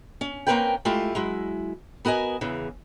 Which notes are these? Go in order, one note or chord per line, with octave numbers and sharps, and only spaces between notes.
C#4
A#3 C4 C#4 A#4 B4 G5
G#3 A3 E4 F4 G4
F#3 G#3 E4
B3 F#4 A#4 D#5 G#5
E2 C#3 E3